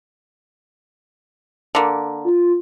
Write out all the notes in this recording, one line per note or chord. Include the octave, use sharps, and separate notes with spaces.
D3 A#3
F4